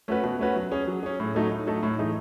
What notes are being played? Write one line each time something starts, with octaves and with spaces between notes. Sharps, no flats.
A3 C#4 F#4 B4
B2
A3 C#4 F#4 B4
F#3
C#4 G#4
F#3
C#4 G#4
A2
F#3 A3 D#4 A4
A2
F#3 A3 D#4 A4
A2
E3 A3 D#4 G#4